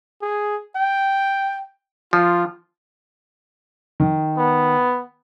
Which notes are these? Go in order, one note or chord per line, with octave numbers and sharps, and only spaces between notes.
G#4
G5
F3 F4
D#3
B3